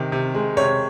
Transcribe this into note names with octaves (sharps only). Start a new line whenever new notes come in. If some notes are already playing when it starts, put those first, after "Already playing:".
Already playing: C3 D#3
C3
G#3
C3 C#5